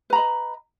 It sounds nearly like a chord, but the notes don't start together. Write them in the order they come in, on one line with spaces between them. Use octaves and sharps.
B4 A#5 B5 D#5